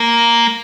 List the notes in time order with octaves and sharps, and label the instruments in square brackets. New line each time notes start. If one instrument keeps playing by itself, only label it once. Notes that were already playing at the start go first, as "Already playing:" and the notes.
Already playing: [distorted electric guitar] A#3